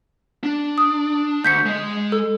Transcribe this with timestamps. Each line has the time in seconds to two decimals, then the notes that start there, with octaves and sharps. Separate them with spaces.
0.43 D4
0.78 D#6
1.44 D2 G6 B6 C#7
1.66 G#3 D#5
2.12 A4